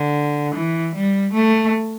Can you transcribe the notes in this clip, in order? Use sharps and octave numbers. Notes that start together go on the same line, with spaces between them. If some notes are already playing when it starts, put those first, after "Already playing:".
Already playing: D3
E3
G3
A3